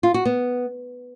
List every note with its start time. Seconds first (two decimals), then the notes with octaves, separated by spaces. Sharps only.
0.03 F4
0.14 F#4
0.25 B3